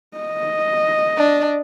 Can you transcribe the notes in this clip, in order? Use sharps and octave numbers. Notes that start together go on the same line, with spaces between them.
D#5
D4